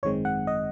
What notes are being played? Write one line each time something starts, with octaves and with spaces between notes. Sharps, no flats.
G#1 F#2 D#3 G#3 C4 C#5
F#5
D#5